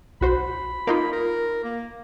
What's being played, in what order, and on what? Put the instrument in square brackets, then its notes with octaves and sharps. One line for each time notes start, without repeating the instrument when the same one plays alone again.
[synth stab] B1 F#4 C5 [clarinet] B5
[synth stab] A#3 D#4 F4
[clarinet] A#4
A#3